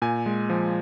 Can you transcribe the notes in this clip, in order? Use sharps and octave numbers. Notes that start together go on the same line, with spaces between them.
A#2 G#5
G#3
F3